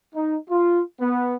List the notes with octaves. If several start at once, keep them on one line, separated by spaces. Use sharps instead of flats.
D#4
F4
B3